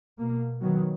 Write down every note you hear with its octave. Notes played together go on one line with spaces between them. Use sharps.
B2 A#3
D#3 F#3 B3